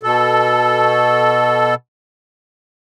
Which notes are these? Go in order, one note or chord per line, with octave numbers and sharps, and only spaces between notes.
B2 A4